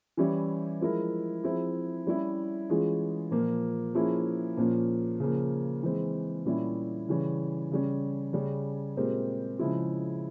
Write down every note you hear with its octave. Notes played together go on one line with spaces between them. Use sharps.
E3 G3 C#4 E4 G4
F3 G#3 E4 A#4
F3 C4 E4 G#4
G3 C#4 E4
E3 G#3 C#4 F4 G#4
A#2 F3 A#3
F3 A#3 C#4 E4 G#4
A#2 F3 A#3 C#4
C#3 F3 A#3
E3 G#3 C4
A#2 G3 C#4 E4
C#3 E3 G3 C#4
C#3 G3 C#4
C#3 G3 C#4
A#2 G#3 C4 G4 A#4
C#3 F3 G#3 E4